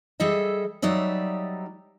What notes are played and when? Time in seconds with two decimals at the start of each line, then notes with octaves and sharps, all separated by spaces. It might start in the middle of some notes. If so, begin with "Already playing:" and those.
0.20 G3 G#4 A4 D#5 E5
0.82 F#3 G3 D#4 D5 E5